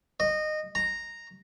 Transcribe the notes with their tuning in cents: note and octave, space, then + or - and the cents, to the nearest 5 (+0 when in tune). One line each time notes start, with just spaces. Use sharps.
D#5 -20
A#5 -5